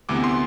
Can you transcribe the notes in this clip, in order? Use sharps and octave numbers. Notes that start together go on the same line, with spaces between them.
D2 C3 E3 B3 D6
C6